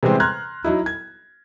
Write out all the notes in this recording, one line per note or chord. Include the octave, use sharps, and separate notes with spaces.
C3 E3 G3 G#3 C4
A#5 C6 F6 F#6 G#6
F#3 D#4 E4
G#6